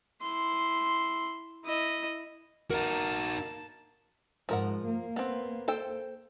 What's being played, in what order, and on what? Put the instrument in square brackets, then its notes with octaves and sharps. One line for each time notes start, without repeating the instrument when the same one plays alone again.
[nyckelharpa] E4 C6
E4 D#5
[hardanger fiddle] A#3 A5 [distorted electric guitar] D#4 F#4 [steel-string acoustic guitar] A#4 A#5
[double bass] G#2 [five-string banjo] F3 A#4 F#5
[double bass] A#3
[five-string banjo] B3 C4
A4 C5 G5